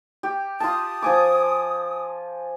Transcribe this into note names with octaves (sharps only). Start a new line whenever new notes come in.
G4
F4 A5 D#6
F3 G#5 D6